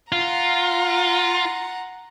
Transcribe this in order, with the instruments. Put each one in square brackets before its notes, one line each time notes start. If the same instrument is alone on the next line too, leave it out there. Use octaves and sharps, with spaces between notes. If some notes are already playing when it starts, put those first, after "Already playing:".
[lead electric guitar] F4 [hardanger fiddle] F#5 A#5